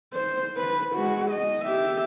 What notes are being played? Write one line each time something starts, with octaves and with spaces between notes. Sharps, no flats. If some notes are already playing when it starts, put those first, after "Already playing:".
C5
B4
G#3 F#4
D#5
G4 E5